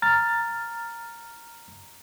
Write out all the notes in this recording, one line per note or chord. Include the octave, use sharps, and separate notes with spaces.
A#5 F6 A6